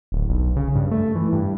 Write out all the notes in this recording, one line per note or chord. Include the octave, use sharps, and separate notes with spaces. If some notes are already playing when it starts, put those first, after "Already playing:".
D1
B1
C#3
G2
A3
E3
G2